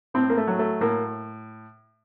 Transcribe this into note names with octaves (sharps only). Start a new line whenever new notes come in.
A2 C4
A#3
A3
F#3
A3
A2 A#3